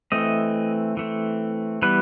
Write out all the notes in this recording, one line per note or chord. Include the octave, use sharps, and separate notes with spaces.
E3 A3 C4 D#5
E3 A3 C4
E3 G3 B3 B4